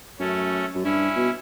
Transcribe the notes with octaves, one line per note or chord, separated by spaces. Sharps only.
F#2 A3 C#4
F#2
G2 C#4 E4
B2